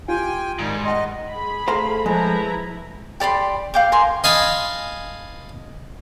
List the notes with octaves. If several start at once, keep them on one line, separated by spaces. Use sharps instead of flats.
F4 G4 G5 G#5
G#2 D#3 G3
D#5 F#5 C6
G#4 B5
A3 A4 C5 F5 A#5
F3 G#3 E4 B4 A#5
G4 D5 B5 C6
F5 G5 D6
A#4 G#5 C6
D#5 F5 G#5 A5 B5